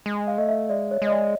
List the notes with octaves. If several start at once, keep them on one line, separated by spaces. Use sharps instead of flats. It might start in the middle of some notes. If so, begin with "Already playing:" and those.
G#3
F5
A3 D#5
E5
G#3 D5
C#5
G#3 D#5
D5